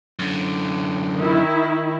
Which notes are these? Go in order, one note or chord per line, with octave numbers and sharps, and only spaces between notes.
F#2 D3
D#3 E4